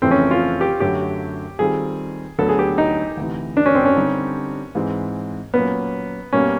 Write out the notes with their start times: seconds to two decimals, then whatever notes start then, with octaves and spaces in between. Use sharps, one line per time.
0.02 F2 C#3 E3 A3 C4
0.11 C#4
0.31 F4
0.61 G4
0.80 F#2 D3 F#3 A3 G4
1.59 D#3 G3 C4 F4 G#4 A4
2.38 D2 D3 F#3 B3 D4 A4
2.49 G#4
2.59 G4
2.78 D#4
3.17 D2 C3 E3
3.57 D4
3.66 C#4
3.75 C4
3.85 C#4
3.96 D3 G3 C4 D#4 G4
4.75 G#2 E3 G#3 C4
5.54 A#2 F#3 A#3 B3 C#4
6.33 B2 G3 A#3 C#4